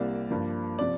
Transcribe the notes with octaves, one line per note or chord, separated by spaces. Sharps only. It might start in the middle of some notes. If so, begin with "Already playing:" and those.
Already playing: C2 C3 G3 A#3 D5
G2 F3 A#3
C3 F3 D5